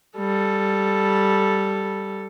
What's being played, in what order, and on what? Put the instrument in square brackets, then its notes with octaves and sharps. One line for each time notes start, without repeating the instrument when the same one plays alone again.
[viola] G3 A4